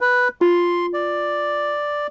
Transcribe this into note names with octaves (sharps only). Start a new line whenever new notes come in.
B4
F4 C6
D5